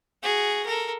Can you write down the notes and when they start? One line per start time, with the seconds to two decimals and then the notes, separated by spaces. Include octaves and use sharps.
0.23 F#4 G#4
0.66 A4 A#4